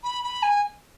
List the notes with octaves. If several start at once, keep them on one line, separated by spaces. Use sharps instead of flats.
B5
B5
G#5